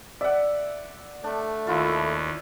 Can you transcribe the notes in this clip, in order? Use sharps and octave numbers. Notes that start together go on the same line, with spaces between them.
D5 E5 F#5
A3 D4
D#2 E4 F4